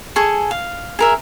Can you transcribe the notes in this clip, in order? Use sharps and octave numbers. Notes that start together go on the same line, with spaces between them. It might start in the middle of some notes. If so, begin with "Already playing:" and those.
G#4 A4 G#5 C#6
F5
G#4 A#4 E5